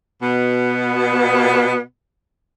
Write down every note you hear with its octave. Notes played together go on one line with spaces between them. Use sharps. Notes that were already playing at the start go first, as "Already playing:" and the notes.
B2 B3